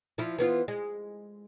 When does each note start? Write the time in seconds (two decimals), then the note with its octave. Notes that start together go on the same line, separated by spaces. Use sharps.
0.18 F3 E4
0.38 E3 B3 F4
0.68 G#3